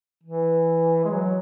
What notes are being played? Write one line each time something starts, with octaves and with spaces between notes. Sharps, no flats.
E3
G#3
F#3